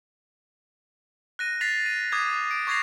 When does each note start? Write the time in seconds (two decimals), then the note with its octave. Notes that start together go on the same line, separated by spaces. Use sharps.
1.39 F#6 A#6 D#7
1.61 A6 B6 C7 F7
1.86 D#7
2.12 D6 D#6 F#6 G#6
2.51 D7
2.67 C#6 D6 G#6 A#6 C7 F7